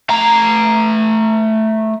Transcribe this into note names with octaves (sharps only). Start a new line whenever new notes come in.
A3 A#5